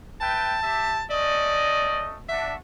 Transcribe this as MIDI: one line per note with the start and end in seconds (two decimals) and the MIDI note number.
0.21 0.57 71
0.21 0.57 76
0.21 0.57 79
0.21 1.03 81
0.62 0.99 67
0.62 0.99 76
1.10 2.18 57
1.10 2.18 61
1.10 2.09 74
1.10 2.18 75
2.29 2.56 62
2.29 2.56 66
2.29 2.55 76